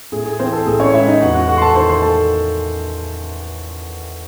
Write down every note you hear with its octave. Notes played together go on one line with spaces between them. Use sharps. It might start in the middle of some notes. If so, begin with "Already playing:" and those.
A2 G#4
G#4
E3 C4 C5
A4
A1 G#4
C#4 C#5
G#3 E4 E5
D#4 D#5
E2 F#4 F#5
F#4 F#5
A3 F#4 F#5
C6
A4 A5
D#3 C5 C6
C5 C6
A3 A4 A5